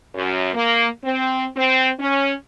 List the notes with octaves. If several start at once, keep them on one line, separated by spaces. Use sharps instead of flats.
F#2
A#3
C4
C4
C#4